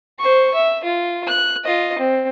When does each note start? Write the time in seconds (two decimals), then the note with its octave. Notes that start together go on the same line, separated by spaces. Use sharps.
0.19 C5 C#6
0.54 E5
0.84 F4
1.27 F#6
1.64 F4 D#5
1.98 C4